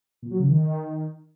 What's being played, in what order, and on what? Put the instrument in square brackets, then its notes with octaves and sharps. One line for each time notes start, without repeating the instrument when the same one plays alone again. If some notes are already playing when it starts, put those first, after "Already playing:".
[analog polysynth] A#2
F#3
C#3
D#3